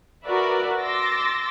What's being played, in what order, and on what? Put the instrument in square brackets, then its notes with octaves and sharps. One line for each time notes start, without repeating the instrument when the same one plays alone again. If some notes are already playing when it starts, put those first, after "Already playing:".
[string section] F#4 A#4 B4 D5 E5
C6 D6 E6 A6 A#6